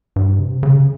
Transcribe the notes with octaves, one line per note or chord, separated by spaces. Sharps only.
G2
C3
C#3